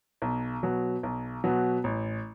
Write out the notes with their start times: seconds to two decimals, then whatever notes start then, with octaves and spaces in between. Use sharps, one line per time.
0.22 B1
0.63 B2 F#3 B3
1.03 B1
1.44 B2 F#3 B3
1.84 A1